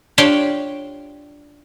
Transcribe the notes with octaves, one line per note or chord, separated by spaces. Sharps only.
D4 F4 G4 C#5 F5 G5